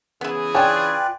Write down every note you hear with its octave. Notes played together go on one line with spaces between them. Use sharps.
C#3 E3 B3 E4 G#4
D4 F4 B4 C#5 D5 G5 G#5